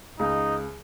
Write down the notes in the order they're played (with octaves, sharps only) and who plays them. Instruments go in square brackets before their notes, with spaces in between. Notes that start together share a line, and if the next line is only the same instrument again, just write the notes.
[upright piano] C#2 [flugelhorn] D#4